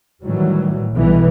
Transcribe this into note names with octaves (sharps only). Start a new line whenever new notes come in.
A2 D#3 E3 F#3 G3
B1 B2 E3 G3